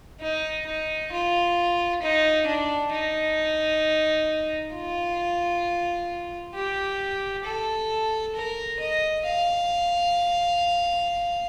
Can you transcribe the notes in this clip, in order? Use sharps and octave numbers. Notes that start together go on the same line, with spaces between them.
D#4
D#4
F4
D#4
D4
D#4
F4
G4
A4
A#4
D#5
F5